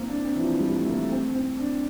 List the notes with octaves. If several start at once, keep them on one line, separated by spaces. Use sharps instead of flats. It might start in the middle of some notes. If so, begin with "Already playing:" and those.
Already playing: A#3 C4
D4
C4
E3
F3
G3
A3
A#3
A3
C4
C4
D4